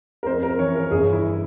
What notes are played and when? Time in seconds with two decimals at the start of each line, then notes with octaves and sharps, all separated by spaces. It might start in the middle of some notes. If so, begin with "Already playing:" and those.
0.23 A#4
0.26 F2 C5
0.43 A#4
0.59 E3 C#5
0.75 A#4
0.91 G1 G#4
1.12 E4